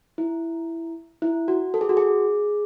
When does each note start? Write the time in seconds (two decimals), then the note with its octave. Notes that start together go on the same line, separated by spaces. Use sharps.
0.18 E4
1.22 E4
1.48 F#4
1.74 A4
1.81 G#4
1.89 F#4
1.97 G#4